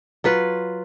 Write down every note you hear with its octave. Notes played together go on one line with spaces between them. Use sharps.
F#3 F4 B4